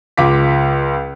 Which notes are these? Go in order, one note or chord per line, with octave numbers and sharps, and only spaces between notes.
C#2 F4 D6 B6